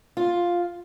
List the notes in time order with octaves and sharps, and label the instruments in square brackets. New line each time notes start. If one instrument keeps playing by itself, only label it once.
[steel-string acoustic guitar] F4